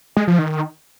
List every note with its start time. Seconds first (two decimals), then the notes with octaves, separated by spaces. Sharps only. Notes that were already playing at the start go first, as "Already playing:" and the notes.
0.17 G#3
0.28 F3
0.39 D#3